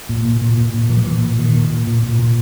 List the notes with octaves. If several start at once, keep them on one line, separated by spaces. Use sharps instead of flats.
A#2
A#2
A#2
A#2
A#2
A#2 E3
F3
A#2 E3
A#2
A#2 D#3
A#2
A#2
A#2
A#2
A#2